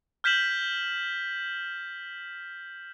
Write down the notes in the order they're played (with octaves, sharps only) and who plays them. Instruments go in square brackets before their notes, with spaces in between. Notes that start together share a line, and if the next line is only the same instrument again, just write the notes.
[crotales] F6 G6 B6 E7 F#7